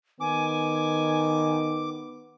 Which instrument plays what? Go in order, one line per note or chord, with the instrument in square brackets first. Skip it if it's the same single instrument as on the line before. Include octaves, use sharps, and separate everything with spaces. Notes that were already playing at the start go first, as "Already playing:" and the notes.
[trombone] D#3 [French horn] B3 [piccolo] G#5 [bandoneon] D6